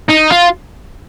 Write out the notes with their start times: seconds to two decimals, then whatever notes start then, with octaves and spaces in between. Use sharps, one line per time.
0.09 D#4
0.31 F4